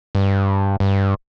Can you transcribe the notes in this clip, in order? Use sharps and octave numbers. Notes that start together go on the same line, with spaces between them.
G2
G2